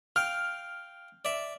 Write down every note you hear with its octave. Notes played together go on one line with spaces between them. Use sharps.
F5 G5 F6
D5 E5